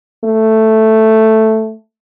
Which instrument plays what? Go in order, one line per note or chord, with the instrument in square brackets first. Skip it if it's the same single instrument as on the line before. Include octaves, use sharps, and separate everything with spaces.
[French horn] A3